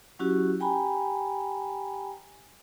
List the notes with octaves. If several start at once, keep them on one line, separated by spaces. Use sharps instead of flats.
F#3 C#4 E4 F#4 G4
G4 G5 G#5 A#5 B5